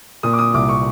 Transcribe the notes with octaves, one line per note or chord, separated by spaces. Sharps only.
A#2 D#6
D6
D#6
C2 D6
C#6